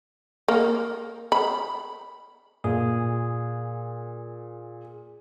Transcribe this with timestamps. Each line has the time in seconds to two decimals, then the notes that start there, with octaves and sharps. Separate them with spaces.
0.48 A#3
1.32 B5
2.64 A#2 G#4